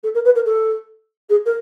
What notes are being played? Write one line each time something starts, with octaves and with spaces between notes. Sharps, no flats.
A4
A#4
B4
A#4
A4
G#4
A#4